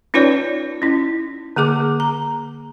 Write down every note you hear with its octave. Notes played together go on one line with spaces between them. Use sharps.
C#4 D#4 F4 B4 C#5 D5
C#4 E4
D3 A#3 G#4 D6
A#5